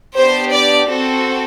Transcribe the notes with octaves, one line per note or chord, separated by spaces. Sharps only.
B3 D4 G4 C5
D5
C4 F#4 A4